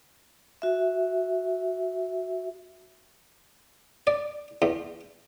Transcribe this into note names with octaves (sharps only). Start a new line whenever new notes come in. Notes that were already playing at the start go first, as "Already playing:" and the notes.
F#4 E5
D5
E2